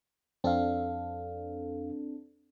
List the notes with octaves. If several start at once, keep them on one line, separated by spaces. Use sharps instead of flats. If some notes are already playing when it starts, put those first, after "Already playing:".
F2 C4 D4 A4 F5